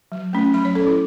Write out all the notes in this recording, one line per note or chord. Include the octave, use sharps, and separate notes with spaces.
F#3
A3 C#4
F#3 B5
C#5
C#4 A4
E4